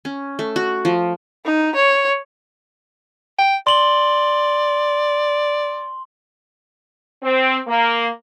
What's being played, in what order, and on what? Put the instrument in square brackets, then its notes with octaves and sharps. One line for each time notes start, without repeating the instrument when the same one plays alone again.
[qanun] C#4
A3
F#4
F3
[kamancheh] D#4
C#5
[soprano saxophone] G5
[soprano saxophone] D5 [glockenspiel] C6 F#7 G7
[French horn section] C4
A#3